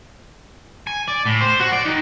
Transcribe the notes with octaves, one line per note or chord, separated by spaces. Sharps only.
G#5
D5
A2
C5
F#4
D5
D#3